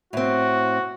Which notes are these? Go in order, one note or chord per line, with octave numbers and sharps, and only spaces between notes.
A2 C4 F#4